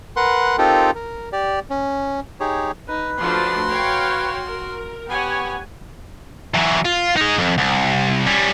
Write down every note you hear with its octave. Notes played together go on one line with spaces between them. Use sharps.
A#4 B4 F#5 C6 F#6
C4 D#4 F4 G4 A4 A#4
A#4
G4 D5
C#4
D#4 G4 G#4 C#5
D#4 B4
F3 A3 D4 F#4 C6
C#5 F5 G5
A#4
B3 G4 C#5 F#5 G#5
E3 F#3
F4
D#4 G#4
F2
C2
G3 C#4